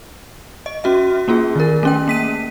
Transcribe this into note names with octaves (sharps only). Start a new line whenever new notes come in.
D#5
C#4 F#4 E5
A#3 C#4 F4 G#4
D#3 A#4
A3 C#4 G5
A#3 B6 D#7